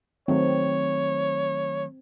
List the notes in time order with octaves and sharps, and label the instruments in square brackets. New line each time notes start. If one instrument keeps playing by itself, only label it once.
[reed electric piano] D#3 F#3 A3 [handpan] C4 [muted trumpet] C#5